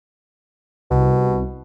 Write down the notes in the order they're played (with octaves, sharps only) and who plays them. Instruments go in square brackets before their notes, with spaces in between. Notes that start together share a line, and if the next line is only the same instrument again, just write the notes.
[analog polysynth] C2 [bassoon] B2